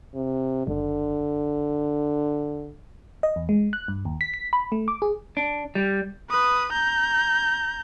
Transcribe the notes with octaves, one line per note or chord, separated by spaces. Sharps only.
C3
F#1 D3
D#5
E2
G#3
F#6
G2
D#2
B6
B6
B5
A3
D6
G#4
D4
G3
B4 D#6
A#5 G6